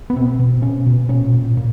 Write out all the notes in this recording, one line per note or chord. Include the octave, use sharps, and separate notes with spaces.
B3
B2 C4
B2
B2 C#4
B2
A#2 C#4
A#2
A#2